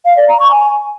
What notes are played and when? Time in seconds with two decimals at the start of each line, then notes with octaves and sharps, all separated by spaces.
0.06 F5
0.17 D5
0.28 A#5
0.40 C#6
0.51 G#5